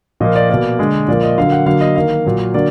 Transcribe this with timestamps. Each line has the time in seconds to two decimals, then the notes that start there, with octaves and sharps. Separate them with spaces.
0.20 A#2 F3 A#3 D#5
0.36 D5
0.49 B2 A#3 D5
0.79 D3 G#3
1.08 A#2 F3 A#3 D5
1.23 D#5
1.38 D3 F#3 A#3 F5
1.52 F#5
1.66 D3 F#3 A#3 F5
1.81 D#5
1.95 D#3 A#3 F5
2.25 A#2 F#3 A#3
2.54 D3 F#3 A#3 D5